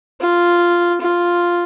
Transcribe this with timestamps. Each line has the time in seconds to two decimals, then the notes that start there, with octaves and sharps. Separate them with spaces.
0.20 F4
1.01 F4